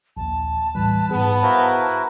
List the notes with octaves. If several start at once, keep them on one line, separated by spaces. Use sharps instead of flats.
A#1 D#2 A5
A2 E3 G3 B4
G#2 B3 G#4
E4 F#4 A#4 C5 F5